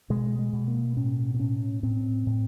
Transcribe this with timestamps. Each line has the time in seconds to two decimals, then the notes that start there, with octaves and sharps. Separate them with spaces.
0.10 B2 G#3
0.39 G#3
0.53 B2
0.68 A#3
0.97 A2 C#4
1.34 C4
1.40 A2 C#4
1.83 A2 C4
2.27 A2